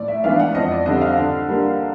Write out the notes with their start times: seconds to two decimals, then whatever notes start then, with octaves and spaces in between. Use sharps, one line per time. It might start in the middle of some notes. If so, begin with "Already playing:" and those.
Already playing: A2 D5
0.08 E5
0.24 E3 G#3 B3 D4 F5
0.39 F#5
0.55 F2 D#5
0.71 D5
0.86 D3 G3 C4 D#5
1.01 F5
1.18 D3
1.48 G3 A#3 D4